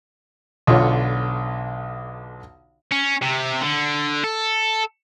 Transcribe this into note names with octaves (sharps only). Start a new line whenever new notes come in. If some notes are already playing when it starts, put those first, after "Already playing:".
B1 D3 F4 C#5
C#4
C3
D3
A4